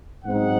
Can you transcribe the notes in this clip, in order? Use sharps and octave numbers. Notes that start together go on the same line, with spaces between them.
G#2 F#3 C4 D#4 F#5